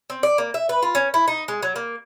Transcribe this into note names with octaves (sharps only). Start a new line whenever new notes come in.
C4
D5
A#3
E5
B4
F4
C#4
E4
D#4
G#3
F#3
A#3